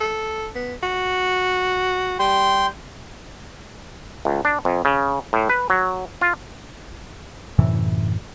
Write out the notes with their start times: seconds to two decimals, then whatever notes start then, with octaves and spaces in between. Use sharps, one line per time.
0.01 A4
0.55 B3
0.83 F#4
2.19 G3 G5 C6
4.25 C#2
4.45 D4
4.65 F2
4.85 C#3
5.33 A2
5.49 B4
5.70 F#3
6.21 F4
7.58 F#2 A2 C3 E3